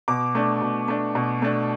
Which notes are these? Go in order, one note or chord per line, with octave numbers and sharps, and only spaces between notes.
B2 D6
A3 D4
B2
A3 D4
B2
A3 D4